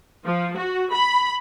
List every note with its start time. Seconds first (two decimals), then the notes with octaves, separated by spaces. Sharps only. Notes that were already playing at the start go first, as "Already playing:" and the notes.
0.24 F3
0.56 F#4
0.93 B5